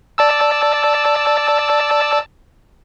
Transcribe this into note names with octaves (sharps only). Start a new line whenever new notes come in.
D5 A5 E6